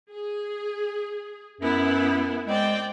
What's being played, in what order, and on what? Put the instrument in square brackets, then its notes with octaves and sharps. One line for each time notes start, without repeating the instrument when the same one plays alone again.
[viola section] G#4
[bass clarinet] F#2 [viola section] B3 E4
[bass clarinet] G#3 [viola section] C4 D5 G5